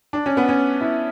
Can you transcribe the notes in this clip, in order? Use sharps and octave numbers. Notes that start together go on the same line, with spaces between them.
D4
C#4
B3
C#4
E4